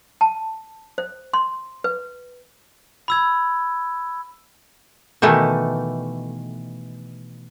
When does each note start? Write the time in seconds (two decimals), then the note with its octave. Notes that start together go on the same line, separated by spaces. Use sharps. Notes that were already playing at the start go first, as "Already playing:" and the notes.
0.21 A5
0.98 C5
1.34 C6
1.84 B4
3.08 B5 E6 G#6
5.22 B2 D#3 E3 A3